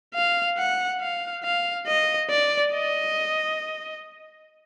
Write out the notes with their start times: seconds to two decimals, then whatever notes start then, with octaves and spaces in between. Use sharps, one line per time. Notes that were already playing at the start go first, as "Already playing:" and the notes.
0.14 F5
0.58 F#5
1.01 F5
1.44 F5
1.87 D#5
2.30 D5
2.73 D#5